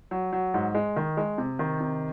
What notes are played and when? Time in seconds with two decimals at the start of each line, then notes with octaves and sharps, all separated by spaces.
0.11 F#3
0.32 F#3
0.54 G#2
0.75 G#3
0.96 D#3
1.17 G#3
1.38 C3
1.59 D#3
1.80 C3